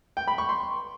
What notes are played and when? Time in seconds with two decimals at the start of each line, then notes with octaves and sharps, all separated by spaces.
0.17 G5
0.28 B5
0.38 C#6
0.49 C6